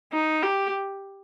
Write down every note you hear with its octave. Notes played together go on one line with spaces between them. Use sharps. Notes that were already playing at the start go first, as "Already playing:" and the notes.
D#4
G4